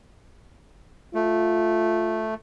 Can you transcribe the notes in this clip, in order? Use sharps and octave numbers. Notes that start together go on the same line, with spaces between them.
A3 F4